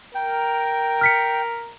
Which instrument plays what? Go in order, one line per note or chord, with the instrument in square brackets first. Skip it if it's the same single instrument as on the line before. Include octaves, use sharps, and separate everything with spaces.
[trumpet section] A#4 [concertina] G5
[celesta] F6 B6 C#7